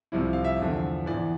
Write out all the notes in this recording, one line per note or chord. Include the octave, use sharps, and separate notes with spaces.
C2 C3 F3 E4
F5
E5
E2 D3 F3
E2 E3 D5